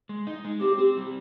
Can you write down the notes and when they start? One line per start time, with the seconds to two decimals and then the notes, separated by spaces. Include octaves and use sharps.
0.09 G#3
0.27 D#4
0.45 G#3
0.61 C4 G4
0.79 C4
0.97 G3